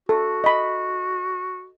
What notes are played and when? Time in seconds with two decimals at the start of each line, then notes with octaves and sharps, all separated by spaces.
0.09 F#4 A4
0.44 D#5 B5